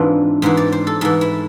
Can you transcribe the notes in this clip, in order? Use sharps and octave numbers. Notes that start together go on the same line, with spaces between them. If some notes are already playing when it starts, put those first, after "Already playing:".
Already playing: G#2 E3 C4 D4 F4
G#2 E3 C5
D5
C5
A4
G#2 E3 A4
E4